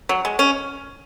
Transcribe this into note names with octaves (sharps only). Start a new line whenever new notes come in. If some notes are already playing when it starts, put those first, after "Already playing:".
F#3
G#3
C#4